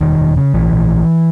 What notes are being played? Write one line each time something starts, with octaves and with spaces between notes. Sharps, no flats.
E1 D#3
E1
C#3
A#1 E3
A#1